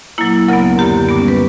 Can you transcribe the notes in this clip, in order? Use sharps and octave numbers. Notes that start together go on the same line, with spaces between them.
A#2 F#3 A#3 E4
D2 C#3 F#3 B3 A#4
F#2 D3 A#3 G4
A#2 G3 B3
C#4
B4